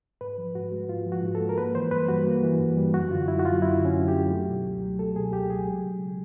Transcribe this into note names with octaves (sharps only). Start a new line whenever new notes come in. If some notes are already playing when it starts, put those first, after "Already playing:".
G#2 B4
F3
G#2 F#4
G#3
G#2 F4
F3
F#4
G#2
A4
G#3
A#4
A#3 B4
E3 C5
G2 B4
G3 F#4
A#3
E3
G2
G3
F#2 F#4
D3 F4
F#2 E4
F#4
F#3 F4
F#2 E4
D3
C#4
F#2
G4
F#3
A3
B2
C#2
F#3
A3 A4
B2 G#4
C#2 G4
F#3 G#4
G#3
C#3